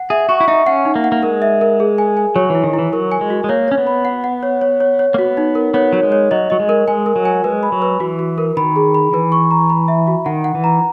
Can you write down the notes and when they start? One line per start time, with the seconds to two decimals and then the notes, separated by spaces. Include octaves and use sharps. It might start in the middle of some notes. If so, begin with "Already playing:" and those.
Already playing: F#5
0.10 G#4 E5
0.29 F#4 C#6
0.41 E4
0.48 D#4 E5
0.66 C#4 F#5
0.85 D#4
0.96 A#3
1.04 F#5
1.12 A#3
1.23 G#3 A#4
1.42 E5
1.61 A#4
1.80 G#4
1.98 G#5
2.17 G#5
2.36 F#3 C#5
2.50 E3 E4
2.64 D#3
2.74 E4
2.79 E3
2.92 F#3 A#4
3.12 G#5
3.21 G#3
3.30 F#4
3.44 G#3
3.49 A#3 C#5
3.68 C#4 C#5
3.78 B3
3.87 B5
4.05 F#5
4.24 F#5
4.43 C#5
4.61 C#5
4.80 C#5
4.99 C#5
5.14 A#3
5.18 B3 F#4
5.37 D#4
5.55 A#4
5.74 B3 C#5
5.93 F#3 C#5
6.03 G#3
6.12 C#5
6.31 F#3 D#5
6.50 F#3 D#5
6.60 G#3
6.69 A#4
6.88 G#3 G#5
7.06 A#4
7.16 F#3
7.25 G#5
7.44 G#3 B4
7.63 B5
7.72 F#3
7.82 B4
8.00 E3 F#4
8.19 F#4
8.38 A#4
8.57 D#3 B5
8.76 G#4
8.94 B5
9.13 E3 B4
9.32 C#6
9.51 A#5
9.70 B5
9.88 E5
10.07 F#4
10.26 D#3 F#5
10.44 F#5
10.55 E3
10.64 A#5